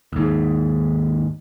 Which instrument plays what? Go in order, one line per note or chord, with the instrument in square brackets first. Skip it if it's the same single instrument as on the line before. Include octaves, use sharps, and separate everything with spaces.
[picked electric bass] D#2 G#2